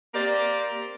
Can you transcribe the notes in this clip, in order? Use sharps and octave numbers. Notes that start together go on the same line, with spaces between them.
A#3 C4 G4 D5